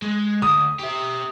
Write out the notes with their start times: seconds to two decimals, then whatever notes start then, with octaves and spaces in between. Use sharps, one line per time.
0.02 G#3
0.42 D2 D#6
0.79 G4 E5